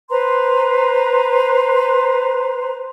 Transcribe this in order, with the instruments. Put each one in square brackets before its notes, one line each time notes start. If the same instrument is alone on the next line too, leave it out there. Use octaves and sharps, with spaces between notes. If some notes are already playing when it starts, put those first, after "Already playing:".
[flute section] B4 C5 A#5 C6